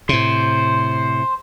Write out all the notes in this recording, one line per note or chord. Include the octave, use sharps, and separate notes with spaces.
A2 C3 C5